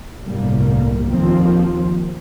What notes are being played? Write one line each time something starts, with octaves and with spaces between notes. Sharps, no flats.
G1 C2 A2 D3 G3 A#3
D#2 F3 A#3 C4